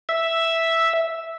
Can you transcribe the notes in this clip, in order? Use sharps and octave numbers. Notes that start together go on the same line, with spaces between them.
E5